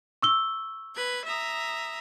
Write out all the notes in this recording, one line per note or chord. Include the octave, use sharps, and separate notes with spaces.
C#6 E6 G7
B4 G#6
E5 A#5 D#6